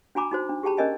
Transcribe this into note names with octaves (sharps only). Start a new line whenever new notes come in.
D4 F#4 G#5 A#5 B5 D6
D#4 F#4 C5
D4
G4 G#4 G5 A5 B5
C#4 A#4 D5 D#5 G#5 A5